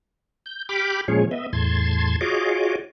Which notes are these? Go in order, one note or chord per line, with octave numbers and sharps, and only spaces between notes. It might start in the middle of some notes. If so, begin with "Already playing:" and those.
G6
G4 G5 B5 D6 F6
A#2 F3 G#3 C#4 G#4 C#5
B3 D#5 E5
E2 A2 A5 C6 G#6
F4 F#4 G#4 C#5 D#5 D6